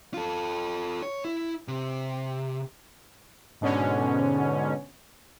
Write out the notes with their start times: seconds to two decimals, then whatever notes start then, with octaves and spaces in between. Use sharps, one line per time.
0.14 F4 A4
1.03 C#5
1.25 E4
1.68 C3
3.61 G#2 B2 D3 C#4